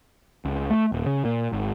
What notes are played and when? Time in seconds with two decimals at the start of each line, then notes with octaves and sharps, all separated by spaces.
0.45 C#2
0.71 A3
0.92 D#1
1.06 C#3
1.25 A#2
1.52 G#1